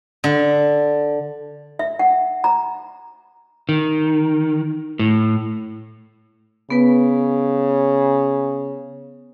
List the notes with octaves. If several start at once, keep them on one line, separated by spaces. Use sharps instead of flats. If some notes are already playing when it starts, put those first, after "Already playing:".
D3
E5
F#5
A#5
D#3
A2
C#3 B3 B4